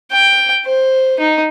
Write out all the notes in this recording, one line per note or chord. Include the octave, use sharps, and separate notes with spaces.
G5
C5
D#4